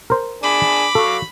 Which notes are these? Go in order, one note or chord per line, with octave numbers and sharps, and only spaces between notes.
A#4 C5
D4 G#4 G#5 B5 D6
F#3 A4 F5 C#6